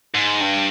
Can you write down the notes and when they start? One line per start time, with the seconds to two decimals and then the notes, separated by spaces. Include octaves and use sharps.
0.14 G#2
0.40 G2